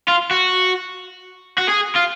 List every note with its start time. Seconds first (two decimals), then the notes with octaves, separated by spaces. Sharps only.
0.08 F4
0.31 F#4
1.58 F#4
1.69 G#4
1.95 F4